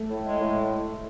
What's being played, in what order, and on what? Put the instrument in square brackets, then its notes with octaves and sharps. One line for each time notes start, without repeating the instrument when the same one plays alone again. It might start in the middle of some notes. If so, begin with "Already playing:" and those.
Already playing: [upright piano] A3
[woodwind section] A2
G#3
A2